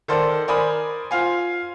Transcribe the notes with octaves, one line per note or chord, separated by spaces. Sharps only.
D#3 A4 C5 D5
A#4 C5 D5 G#5 B5 D#6
F4 C5 F5 G#5